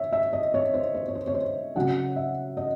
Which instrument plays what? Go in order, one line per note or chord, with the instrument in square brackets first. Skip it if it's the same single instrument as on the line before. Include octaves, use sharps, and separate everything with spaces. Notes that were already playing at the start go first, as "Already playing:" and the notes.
Already playing: [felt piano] C#5 E5
E5
D#5
C#5
C5
C5
C#5
C5
C#5
C5
C#3 F#3 C#4 F#5
E5
D#5